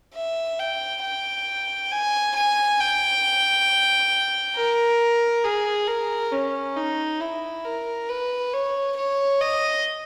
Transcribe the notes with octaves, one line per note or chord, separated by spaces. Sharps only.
E5
G5
G5
G#5
G#5
G5
A#4
G#4
A#4
C#4
D#4
E4
A#4
B4
C#5
C#5
D#5